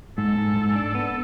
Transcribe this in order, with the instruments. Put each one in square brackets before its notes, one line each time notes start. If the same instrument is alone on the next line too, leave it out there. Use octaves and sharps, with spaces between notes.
[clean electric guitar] G#2 [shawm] A4
[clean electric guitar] G#2
G#2
D4
B3